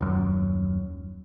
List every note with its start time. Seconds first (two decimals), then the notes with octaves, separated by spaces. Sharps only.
0.01 D#1 F#2